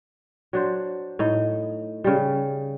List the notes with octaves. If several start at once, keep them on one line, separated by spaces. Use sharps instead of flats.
F#3 D4 C5
A2 D#4
C#3 G3